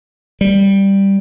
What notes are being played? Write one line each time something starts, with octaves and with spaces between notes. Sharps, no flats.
G3